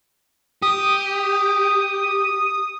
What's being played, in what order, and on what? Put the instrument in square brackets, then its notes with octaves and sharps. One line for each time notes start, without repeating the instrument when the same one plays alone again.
[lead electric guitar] G4 [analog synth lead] D#6